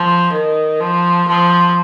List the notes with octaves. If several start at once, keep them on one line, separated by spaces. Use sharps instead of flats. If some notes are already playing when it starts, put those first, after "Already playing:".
Already playing: F3
D#3
F3
F3